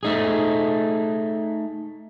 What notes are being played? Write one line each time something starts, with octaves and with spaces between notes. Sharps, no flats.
A3 D#4 G#4